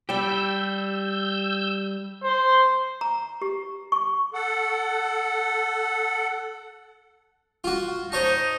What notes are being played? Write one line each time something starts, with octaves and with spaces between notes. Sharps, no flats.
G3 G4 E6 G6
C5
A#5
G4
C#6
A4 F#5
F4 F#4
D#4 C5 C#5 A5